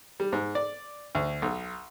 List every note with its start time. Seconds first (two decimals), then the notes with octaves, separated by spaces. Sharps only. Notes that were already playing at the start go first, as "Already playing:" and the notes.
0.20 G3
0.33 G#2
0.55 D5
1.15 D2
1.42 B1